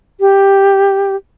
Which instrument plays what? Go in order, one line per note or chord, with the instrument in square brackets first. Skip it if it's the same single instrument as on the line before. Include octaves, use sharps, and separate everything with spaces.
[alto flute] G4